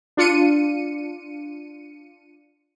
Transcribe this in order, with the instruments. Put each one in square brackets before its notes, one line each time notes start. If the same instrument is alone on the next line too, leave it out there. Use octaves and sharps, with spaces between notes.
[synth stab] D4 F4 C#7 D#7